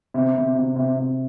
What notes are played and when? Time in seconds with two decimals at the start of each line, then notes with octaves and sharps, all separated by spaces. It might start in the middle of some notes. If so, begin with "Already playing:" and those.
0.14 C3
0.34 C3
0.55 C3
0.76 C3
0.96 C3